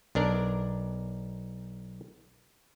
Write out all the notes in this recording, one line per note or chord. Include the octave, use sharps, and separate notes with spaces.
B1 D4 A#4 D5